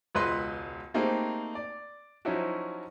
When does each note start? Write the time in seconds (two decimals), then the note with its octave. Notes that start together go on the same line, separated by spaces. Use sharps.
0.15 E1 C#2 B4 D#5 C6
0.94 A3 A#3 C4 D#4 G4 G#4
1.55 D5
2.25 F3 F#3 C#4 D#4 E4 F#4